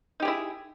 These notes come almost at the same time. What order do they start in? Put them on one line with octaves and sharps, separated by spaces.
D#4 G4 G#4 E4